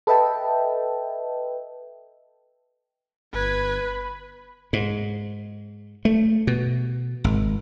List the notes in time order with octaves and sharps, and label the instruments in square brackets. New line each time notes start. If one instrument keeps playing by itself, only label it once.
[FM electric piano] A4 B4 D#5 E5 G5 A5
[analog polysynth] G1 G#6 [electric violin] B4
[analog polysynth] B5
[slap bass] G#2
A3
B2
G#1